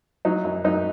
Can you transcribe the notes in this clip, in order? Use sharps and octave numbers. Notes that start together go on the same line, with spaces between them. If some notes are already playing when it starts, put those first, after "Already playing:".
F#3 D#4
F#2
F#2 D#4